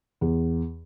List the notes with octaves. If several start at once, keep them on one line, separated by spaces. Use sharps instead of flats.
E2